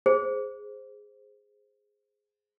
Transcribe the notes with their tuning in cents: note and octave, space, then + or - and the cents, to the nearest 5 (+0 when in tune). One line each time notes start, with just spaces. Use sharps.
G#4 +0 C5 +0